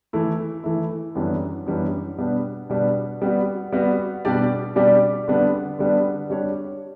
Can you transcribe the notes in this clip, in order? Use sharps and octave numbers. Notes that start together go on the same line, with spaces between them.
E3 A3 E4
E3 A3 E4
F#2 E3 G3 B3 D4
F#2 E3 G3 B3 D4
B2 G3 B3 D4
B2 G3 B3 D4
G3 B3 F#4
G3 B3 F#4
B2 G3 D4 G4 D5
B2 G3 D4 G4 D5
D3 G3 B3 D4
D3 G3 B3 D4
G3 D4 G4 C#5